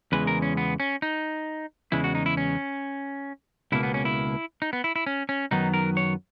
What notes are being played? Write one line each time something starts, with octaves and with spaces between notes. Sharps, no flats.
E2 C#3 E3 G#3 B4
A#4
C#4
B3
C#4
D#4
E2 C#3 G#3 E4
F#4
D#4
E4
C#4
C#2 B2 A#3 E4
B3
C#4
E4
D#4
B3
E4
E4
C#4
C#4
F#2 D#3 F#3 B3 D#4
A#4
C#5